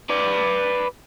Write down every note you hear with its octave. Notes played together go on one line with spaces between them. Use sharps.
B4 D5